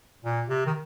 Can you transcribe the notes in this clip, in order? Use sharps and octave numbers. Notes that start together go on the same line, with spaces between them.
A#2
C3
D#3